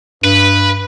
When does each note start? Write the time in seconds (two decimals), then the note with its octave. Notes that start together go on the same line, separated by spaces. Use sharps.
0.24 G2 B4